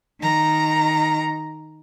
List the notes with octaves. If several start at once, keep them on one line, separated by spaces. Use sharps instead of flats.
D#3 A#5